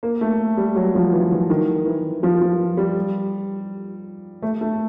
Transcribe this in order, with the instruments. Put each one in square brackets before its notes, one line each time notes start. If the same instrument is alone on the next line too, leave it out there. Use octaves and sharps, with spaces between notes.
[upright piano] A#3
A3
G3
F#3
F3
E3
E3
D#3
E3
F3
F3
G3
A3
A3